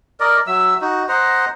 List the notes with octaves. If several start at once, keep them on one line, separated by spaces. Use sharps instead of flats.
A#4 D5 D#5
F#3 E5 E6
D#4 F#4
C5 D#5 F#5 A#5